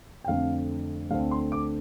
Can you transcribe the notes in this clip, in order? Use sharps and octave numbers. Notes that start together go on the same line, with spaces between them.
G5
F2 D3 A3 C4 F5
D2 D3 A3 C4 F5
C6
D6